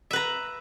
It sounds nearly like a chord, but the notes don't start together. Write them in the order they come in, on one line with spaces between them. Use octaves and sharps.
E5 B4 A#5